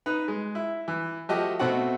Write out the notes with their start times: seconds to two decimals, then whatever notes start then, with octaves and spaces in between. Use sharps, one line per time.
0.06 D#4 B4
0.28 G#3
0.55 E4
0.88 E3
1.29 F3 A3 F#4 G4 D#5
1.59 B2 A3 C4 F#4 F#5